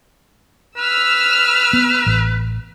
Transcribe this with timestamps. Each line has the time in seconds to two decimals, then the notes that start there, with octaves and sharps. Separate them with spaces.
0.77 B4 E6 F6
1.73 B3
2.06 A1